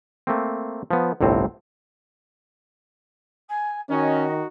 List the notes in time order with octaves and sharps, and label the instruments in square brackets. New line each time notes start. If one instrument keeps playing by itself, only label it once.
[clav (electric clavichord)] A3 A#3 C4
F3 B3
G1 C2 A2 C4
[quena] G#5
[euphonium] D#3 [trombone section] C#4 [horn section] D#4 F#4 [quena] D#5